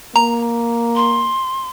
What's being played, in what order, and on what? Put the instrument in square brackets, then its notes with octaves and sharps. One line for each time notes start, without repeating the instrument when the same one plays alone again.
[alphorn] A#3 [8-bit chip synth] A#5
[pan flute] C6